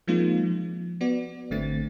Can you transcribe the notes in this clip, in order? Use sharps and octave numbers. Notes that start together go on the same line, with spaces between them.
F3 G#3 A#3 C4 D#4 F4
F3
B3 F#4 D5
G#1 D3 A3 C4 A6